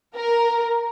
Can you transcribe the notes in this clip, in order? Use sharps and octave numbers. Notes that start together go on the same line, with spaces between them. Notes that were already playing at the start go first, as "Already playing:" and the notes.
A#4